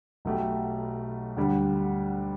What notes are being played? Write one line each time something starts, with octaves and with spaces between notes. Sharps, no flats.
B1 B2 A3 G4
D2 D3 G3